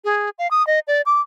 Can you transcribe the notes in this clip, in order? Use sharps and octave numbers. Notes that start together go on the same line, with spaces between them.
G#4
F5
D#6
D#5
D5
D6